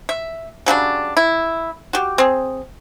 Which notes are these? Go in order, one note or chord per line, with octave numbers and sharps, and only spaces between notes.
E5
C#3 F#3 G3 D4
E4
F#4 G4
C4 G#4